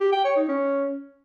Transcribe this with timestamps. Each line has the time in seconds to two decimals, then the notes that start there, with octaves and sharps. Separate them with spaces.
0.01 G4
0.12 G5
0.24 C#5
0.36 D#4
0.48 C#4